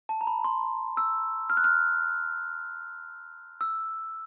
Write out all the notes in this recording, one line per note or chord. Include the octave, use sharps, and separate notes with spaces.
A5
A#5
B5
C6
E6
F6
F#6
F6
E6